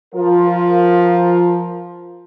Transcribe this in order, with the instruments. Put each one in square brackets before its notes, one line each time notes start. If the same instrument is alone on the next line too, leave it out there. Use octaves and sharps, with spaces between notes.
[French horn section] F3 F4 A#4